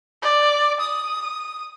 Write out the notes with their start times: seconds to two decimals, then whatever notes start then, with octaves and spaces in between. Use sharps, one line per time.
0.22 D5
0.80 D#6